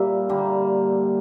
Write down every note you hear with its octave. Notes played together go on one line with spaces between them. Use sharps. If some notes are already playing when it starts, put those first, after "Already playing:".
Already playing: A#2 G3 A#3 E5
D3 G3 A#3